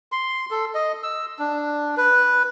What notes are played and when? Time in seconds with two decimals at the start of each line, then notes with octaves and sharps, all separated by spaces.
0.12 C6
0.51 A4
0.75 D#5
1.03 E6
1.39 D4
1.97 B4